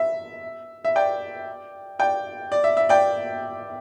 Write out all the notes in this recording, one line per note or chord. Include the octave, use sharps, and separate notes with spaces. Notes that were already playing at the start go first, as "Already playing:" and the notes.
Already playing: E5
E5
D5 G5
D5 G5
D5
E5
E5
D5 G5